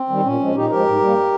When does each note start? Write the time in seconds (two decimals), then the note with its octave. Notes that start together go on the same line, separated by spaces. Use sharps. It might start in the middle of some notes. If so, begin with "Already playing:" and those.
Already playing: C4
0.09 D#3 G3
0.23 A#2 C#4
0.39 F3 G#3
0.55 A#2 D#4 G4
0.69 F3 G#3 G4 A#4
0.85 G#2
1.00 G3 A#3